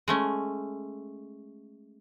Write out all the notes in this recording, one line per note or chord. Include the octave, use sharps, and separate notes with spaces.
G#3 A3 C#4